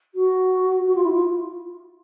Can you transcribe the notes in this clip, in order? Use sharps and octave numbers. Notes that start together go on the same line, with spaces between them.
F#4
F#4
F4
E4
F4